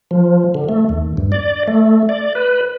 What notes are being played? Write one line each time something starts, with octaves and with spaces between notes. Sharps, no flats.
F3
D3
A3
D#2
G2
D5
A3
D5
B4